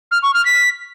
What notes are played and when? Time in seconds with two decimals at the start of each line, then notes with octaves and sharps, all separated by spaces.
0.11 F6
0.23 C#6
0.34 F6
0.45 B6